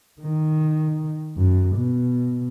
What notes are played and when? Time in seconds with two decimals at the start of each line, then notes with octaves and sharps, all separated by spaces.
0.21 D#3
1.37 F#2
1.76 B2